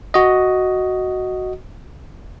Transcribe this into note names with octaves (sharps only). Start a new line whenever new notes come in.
F#4 D#5